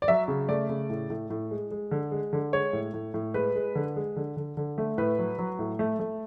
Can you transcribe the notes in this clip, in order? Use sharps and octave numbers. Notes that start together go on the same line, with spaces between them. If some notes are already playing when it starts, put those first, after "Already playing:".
D5
F#3 E5
C#3
A3 D5
C#3
A2
A2
A2
G#3
G#3
D3
G#3
D3
G#3 C#5
A2
A2
A2
G#3 B4
G#3
D3
G#3
D3
D3
D3
A3
A2 B4
F#3
F#3
A2
A3
A3